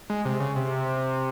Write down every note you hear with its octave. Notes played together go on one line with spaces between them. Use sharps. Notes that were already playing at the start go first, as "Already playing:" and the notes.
G#3
C3
C#3
C3